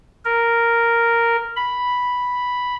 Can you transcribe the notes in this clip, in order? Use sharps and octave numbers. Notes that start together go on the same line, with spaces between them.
A#4
B5